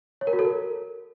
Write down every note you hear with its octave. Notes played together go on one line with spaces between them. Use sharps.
C#5
A#4
F#4
A4
A#4